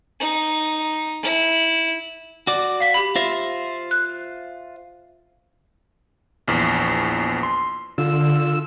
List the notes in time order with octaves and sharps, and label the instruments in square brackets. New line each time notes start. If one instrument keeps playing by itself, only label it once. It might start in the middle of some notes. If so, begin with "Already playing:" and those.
[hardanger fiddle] D#4
E4
[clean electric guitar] F#4 D5
[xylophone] F5 B6
G4 B5
[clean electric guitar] F4 C5 E5 [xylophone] A#6
[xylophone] F#6
[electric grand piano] A#1 E2
C6
[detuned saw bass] D3 [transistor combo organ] F4 E6